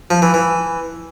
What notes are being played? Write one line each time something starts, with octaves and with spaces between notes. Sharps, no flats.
F3
E3
E3